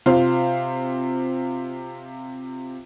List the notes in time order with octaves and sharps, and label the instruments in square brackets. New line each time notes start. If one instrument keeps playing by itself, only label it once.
[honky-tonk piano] C3 F4 C5 F5